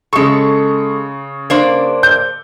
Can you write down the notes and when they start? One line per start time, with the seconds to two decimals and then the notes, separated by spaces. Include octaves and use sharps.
0.13 C#3 G#3 A4 C#6
1.50 A#3 D4 C5
2.03 G6